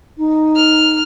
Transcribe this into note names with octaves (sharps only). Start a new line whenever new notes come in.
D#4
F6